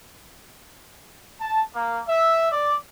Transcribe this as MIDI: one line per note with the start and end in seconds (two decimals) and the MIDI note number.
1.41 1.61 81
1.75 2.02 58
2.08 2.49 76
2.52 2.75 74